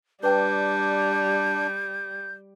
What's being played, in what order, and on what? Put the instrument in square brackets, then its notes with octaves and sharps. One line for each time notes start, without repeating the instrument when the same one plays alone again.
[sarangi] G3 [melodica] D4 [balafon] B4 G5 A5 [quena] G6